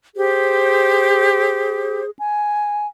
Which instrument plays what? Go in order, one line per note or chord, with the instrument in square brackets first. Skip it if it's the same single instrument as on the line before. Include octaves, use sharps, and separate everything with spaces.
[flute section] G4 C5 [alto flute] G#4
[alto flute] G#5